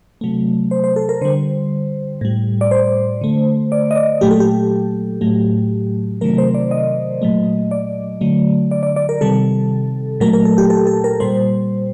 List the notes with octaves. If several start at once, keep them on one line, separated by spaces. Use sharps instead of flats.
C3 F#3 A3
C5
C5
A4
A#4
D3 G3 C5
A2 G3
D5
C5
D3 A3
D5
D#5
D5
A#2 F#3 A3 G4
A4
G4
A2 F#3 A3
C3 D#3 F#3 A3 A#4
C5
D5
D#5
A#2 F#3 A3
D5
D3 F#3 A3
D5
D5
D5
A#4
C3 D#3 G3 A4
A#2 F#3 A3 A#4
A#4
A4
G4
A4
A4
A#4
A#2 G3 C5